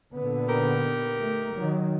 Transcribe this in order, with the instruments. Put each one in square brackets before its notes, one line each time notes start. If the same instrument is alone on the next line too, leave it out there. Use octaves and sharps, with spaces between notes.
[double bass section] A#2 D3 B3
[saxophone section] D#4 G4 A#4
[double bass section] A3
D#3 F#3